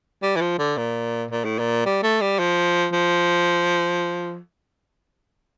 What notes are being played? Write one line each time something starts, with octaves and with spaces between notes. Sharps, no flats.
G3
E3
F3
D3
A#2
A#2
A2
A#2
G3
A3
G3
F3
F3